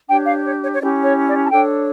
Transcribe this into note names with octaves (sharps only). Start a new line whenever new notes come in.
D4 G4 C#5 G5
F5
C#5
C#5
C#5
C#4 E4 G4 D5
C#5
D5
A5
D4 A4 C#5 G5